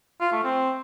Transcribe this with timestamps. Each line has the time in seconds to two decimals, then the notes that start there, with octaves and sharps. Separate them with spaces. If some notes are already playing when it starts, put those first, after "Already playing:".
0.20 F4
0.32 A3
0.43 C4